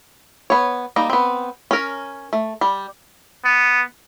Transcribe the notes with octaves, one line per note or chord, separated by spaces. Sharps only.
B3 C#5
G3 A#3 D#4
B3 C4
C#4 A#4
A3
G3
B3